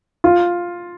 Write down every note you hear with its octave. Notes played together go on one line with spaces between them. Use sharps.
F4